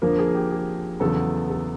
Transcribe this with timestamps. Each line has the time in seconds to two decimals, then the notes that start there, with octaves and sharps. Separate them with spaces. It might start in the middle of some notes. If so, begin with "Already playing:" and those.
0.02 F2 D3 F3 A#3 A#4
0.19 G#4
0.35 G4
0.51 G#4
1.00 E2 C#3 F#3 B3 A4
1.50 A4